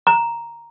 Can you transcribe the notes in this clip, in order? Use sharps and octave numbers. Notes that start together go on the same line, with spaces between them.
A#5